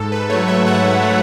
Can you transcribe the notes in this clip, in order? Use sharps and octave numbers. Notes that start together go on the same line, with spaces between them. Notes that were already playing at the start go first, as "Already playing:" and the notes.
Already playing: G#2 A4
B4
F#3 A3 C#5
E5
G#2 F#5
F#3 A3